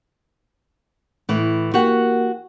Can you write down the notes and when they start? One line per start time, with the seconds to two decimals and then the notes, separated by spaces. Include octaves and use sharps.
1.29 A2 E3
1.74 A#3 F#4 G4 F#5